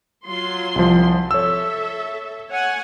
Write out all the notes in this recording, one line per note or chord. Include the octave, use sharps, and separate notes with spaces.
F#3 F4 C6
C2 F3
A4 C#5 E5 E6
C#5 F#5 G#5